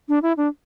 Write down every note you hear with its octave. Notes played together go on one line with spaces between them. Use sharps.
D4
E4
D4